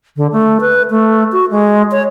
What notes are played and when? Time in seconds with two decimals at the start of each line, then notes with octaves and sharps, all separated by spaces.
0.17 D3
0.32 A3
0.61 B4
0.91 A3
1.32 F#4
1.51 G#3
1.91 C#5